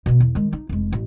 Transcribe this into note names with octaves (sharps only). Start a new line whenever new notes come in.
B2 B3
E2
D#3 G#3
D#4
F1 G#3
A1